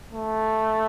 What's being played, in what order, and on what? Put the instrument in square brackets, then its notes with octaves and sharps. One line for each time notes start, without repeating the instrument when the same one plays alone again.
[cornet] A3